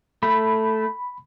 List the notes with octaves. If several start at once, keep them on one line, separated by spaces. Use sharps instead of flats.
A3 B5